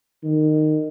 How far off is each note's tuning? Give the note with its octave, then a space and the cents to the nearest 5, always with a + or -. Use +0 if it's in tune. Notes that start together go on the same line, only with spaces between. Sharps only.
D#3 -15